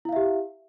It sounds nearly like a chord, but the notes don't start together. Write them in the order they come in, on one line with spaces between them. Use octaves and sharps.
E4 F5 E5 G4